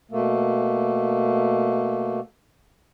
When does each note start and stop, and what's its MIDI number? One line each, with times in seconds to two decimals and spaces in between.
0.11 2.20 47
0.11 2.20 57
0.11 2.20 58